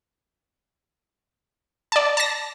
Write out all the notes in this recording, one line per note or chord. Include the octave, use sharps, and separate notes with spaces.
D5 A5
A5 A#6